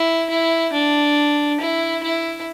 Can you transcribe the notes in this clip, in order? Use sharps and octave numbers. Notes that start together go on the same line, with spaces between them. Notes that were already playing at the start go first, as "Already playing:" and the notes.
Already playing: E4
E4
D4
E4
E4